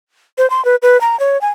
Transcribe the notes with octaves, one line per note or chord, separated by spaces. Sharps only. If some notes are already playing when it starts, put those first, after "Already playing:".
C5
C6
B4
B4
A#5
C#5
G#5